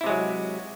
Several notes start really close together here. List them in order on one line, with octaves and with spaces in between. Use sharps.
E4 C3 G#3 F#3